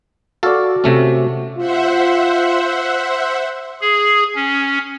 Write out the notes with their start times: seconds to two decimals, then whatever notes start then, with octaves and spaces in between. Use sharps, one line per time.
0.43 F#4 A4 D5 F5
0.84 C3 A3 C#4
1.57 F4 C5 E5 F#5
3.81 G#4
4.35 C#4